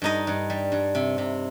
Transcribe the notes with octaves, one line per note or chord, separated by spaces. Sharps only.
G2 D#4 D#5
G2
G3
G2
C3
C3